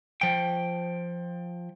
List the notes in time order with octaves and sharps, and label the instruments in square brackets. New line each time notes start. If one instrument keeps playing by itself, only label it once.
[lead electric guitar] F3 G5